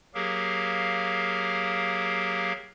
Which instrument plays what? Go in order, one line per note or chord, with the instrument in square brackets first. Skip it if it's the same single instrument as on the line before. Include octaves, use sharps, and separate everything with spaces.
[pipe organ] F#3 A#3 G4 G#4 A#4 F5